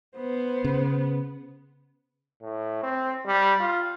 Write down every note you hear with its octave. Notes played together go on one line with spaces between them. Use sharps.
B3 C5
C#3
A2
C4
G3
F4